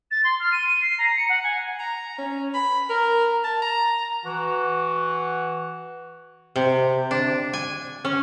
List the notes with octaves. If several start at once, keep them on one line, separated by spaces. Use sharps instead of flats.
A6
C6
F6
D#7
D#7
C7
A#5
C#7
F#5
G#5
A#5
C#4
B5
A#4
A5
A#5
E3 F#4
C3
D4
G#5
C#4